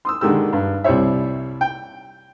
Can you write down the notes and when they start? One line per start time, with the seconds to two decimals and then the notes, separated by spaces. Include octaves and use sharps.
0.05 C6 D#6 E6
0.21 D3 D#3 G#3 G4 E6
0.53 G2
0.84 C2 G3 E4 C5 C#5 E5
1.61 G5